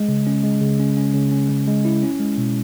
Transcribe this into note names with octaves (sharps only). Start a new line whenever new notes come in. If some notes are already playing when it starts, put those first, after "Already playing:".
Already playing: G#3
C#3
C#4
G#3
C#3
C#4
C#4
C#3
C#4
C#3
G#3
E4
C#4
G#3
B2